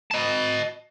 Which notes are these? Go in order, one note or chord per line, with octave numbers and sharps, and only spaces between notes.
D#5 A5